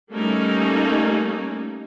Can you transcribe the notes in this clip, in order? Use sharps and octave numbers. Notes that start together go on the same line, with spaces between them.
G3 A3 A#3 C#4 D#4